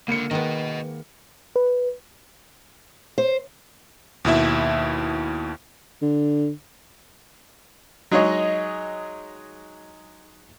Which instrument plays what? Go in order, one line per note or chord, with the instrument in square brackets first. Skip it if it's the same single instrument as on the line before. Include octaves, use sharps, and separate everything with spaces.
[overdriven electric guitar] C#2 D3 [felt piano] A#3 C#7
[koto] D#3 G#3 B3 [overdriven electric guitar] B4 D#5
[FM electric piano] B4
[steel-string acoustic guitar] C5
[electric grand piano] D#2 B2 E4 E5
[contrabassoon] D3
[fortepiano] F#3 G#3 D#4 G#4 C#5 D#5